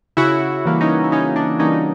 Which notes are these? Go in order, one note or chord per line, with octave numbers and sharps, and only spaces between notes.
C#3 E4 F#4
E3 G3 A#3
C#4 D#4
E4
C#3 C#4 D#4
D4
E3 G3 A#3 C#4 D#4